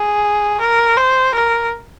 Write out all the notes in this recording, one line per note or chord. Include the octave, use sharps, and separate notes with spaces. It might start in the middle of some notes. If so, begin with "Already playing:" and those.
Already playing: G#4
A#4
C5
A#4